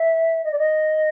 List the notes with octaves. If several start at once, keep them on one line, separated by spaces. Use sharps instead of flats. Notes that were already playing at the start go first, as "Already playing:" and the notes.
Already playing: E5
D#5
D5
D#5